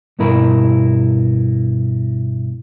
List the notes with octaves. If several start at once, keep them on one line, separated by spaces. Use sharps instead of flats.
G2 B2 E4 A#4 B5